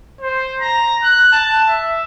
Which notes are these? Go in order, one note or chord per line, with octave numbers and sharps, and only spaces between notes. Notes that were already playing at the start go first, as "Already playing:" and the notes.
C5
A#5
F#6
A5
E5